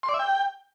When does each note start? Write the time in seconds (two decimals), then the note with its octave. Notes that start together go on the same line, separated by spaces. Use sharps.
0.03 C6
0.09 D5
0.14 E5
0.19 G5